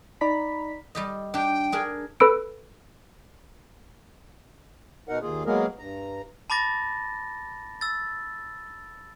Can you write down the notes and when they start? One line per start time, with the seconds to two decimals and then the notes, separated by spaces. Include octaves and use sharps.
0.21 D#4 D5 A#5 B5 B6
0.95 G3 G4 D#5
1.34 D4 G4 G5
1.72 D4 G#4 A#4
2.20 A4 B4 B5 E6 D7
5.09 B2 D#4 A#4 F#5
5.22 D#2 A#3 F4 G#4
5.46 F#3 G#3 A#3 B3 G#4 A#4
5.79 G2 A#5
6.50 A5 B5 D6 A6 A#6
7.81 E6 A6